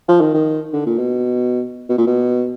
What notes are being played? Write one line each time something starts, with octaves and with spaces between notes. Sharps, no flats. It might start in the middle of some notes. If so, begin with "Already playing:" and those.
F3
D#3
D#3
D3
A#2
B2
B2
A#2
B2